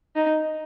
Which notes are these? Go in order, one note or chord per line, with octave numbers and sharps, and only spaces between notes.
D#4